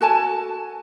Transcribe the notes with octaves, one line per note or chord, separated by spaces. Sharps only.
F#4 A4 G#5 A5